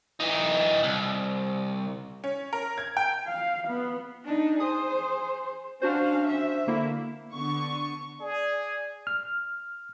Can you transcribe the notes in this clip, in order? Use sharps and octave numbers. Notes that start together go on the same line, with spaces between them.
E3 D#4
C2
C#4
A#4
G#6
G5
F5
B3
D4 D#4
G#4 C5 D#6
C#4 D4 F#4 C5 F5
E5
D3 A#3 E4
D3 B3 C#6
G#4 D5
F6